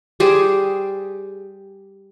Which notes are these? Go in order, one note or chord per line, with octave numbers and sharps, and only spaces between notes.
G3 G4 G#4 C5